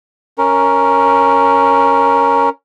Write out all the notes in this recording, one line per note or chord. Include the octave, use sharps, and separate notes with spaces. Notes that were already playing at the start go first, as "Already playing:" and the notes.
C#4 A#4